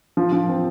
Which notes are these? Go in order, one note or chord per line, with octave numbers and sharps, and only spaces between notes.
F3
F3
C4